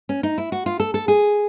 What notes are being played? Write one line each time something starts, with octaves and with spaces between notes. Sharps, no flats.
C#4
D#4
E4
F#4
F4
A4
A4
G#4